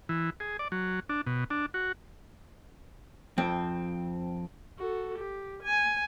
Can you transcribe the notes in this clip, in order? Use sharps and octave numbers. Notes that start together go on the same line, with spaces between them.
E3
G#4
D5
F#3
D4
B2
D4
F#4
F2 C4
F#4 A4
G4
G#5